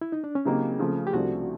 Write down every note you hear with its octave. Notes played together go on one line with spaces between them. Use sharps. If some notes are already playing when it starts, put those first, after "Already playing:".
E4
D#4
D4
C#4
C#3 F#3 A#3 C4 D#4 G4
C#3 F3 A3
G4
C2 C3 F3 A3 D4 F#4